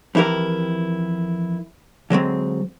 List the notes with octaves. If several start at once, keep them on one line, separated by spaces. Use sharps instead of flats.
F2 E3 E4 G4 A#4
D3 F#3 G#3 C4